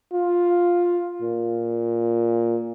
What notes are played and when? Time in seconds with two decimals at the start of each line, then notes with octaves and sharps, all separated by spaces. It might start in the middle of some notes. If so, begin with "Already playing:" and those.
0.13 F4
1.22 A#2